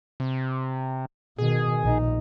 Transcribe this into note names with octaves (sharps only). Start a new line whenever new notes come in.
C3
B2 D#3 G#4
A#1 D#4